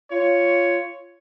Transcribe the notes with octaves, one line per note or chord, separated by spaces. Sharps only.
F4 C#5